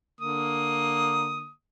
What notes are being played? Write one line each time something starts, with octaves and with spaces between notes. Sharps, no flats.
D3 A#3 D#6